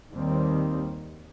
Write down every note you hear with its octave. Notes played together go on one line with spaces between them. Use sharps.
D#2 D#3 G3 C4